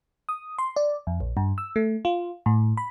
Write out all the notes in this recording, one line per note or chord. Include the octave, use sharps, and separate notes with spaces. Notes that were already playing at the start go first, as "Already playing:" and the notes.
D#6
C6
D5
F2
A#1
G2
E6
A3
F4
A2
B5